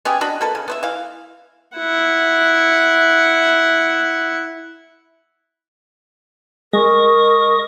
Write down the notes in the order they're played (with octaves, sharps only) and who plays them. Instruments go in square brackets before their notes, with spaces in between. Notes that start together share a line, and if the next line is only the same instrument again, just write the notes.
[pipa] B3 C#4 G4 G#4
D4 F#4 D#5 B5
A#3 A4 B4
C#3
B3 C5 E5
E3 F5
[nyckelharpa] E4 F#5
[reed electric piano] G#3 [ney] A#4 [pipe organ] D#5 C#6 D#6